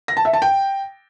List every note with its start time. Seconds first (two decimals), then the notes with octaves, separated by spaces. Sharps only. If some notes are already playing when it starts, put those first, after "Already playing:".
0.08 A#6
0.17 A5
0.25 E5
0.33 A5
0.42 G5